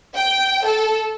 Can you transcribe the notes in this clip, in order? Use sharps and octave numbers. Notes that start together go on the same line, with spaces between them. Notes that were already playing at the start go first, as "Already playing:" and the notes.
G5
A4